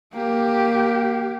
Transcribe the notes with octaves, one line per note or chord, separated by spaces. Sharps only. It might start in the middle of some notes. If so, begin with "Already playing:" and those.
A#3 G4